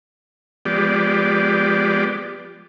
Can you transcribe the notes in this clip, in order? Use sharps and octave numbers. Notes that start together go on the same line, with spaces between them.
F3 G#3 B3 G4 D5